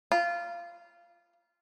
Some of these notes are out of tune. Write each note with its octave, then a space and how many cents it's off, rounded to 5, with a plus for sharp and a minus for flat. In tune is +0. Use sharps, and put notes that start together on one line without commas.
F4 -15